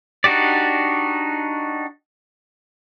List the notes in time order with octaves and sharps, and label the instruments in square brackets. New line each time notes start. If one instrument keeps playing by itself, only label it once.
[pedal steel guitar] D4 D#4 F#4 G4 D5